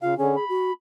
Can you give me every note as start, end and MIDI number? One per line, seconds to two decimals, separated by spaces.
0.02 0.14 49
0.02 0.17 65
0.02 0.14 77
0.18 0.36 50
0.18 0.36 61
0.18 0.44 68
0.37 0.73 83
0.49 0.71 66